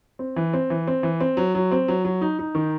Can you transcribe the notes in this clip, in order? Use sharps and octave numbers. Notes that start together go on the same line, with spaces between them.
C4
E3
C4
E3
C4
E3
C4
F#3
F#3
C4
F#3
F#3
D#4
D#4
D#3